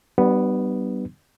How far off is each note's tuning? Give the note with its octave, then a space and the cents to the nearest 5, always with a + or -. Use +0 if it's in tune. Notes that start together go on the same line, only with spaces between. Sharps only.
G3 -25 B3 +0 D4 +35